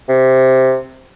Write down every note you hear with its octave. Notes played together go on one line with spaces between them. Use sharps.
C3